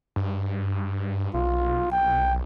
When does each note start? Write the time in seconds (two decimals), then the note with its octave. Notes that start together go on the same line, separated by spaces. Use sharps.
0.16 G2
1.34 B1 F4
1.92 G5